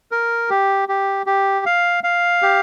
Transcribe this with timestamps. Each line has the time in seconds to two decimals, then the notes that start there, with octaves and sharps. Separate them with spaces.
0.12 A#4
0.50 G4
0.89 G4
1.26 G4
1.66 F5
2.04 F5
2.42 G4